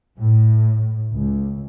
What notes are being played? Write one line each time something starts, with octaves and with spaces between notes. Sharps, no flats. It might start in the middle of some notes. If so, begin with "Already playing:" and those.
A2
C#2